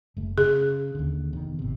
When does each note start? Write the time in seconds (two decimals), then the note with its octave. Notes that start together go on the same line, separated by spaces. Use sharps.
0.17 F#1 A3
0.38 C#3 G#4
0.95 D#2 D3
1.33 F1 D#3 B3
1.59 G#1 C3